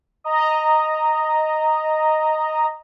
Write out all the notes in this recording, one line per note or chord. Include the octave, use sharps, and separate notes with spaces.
D#5 A#5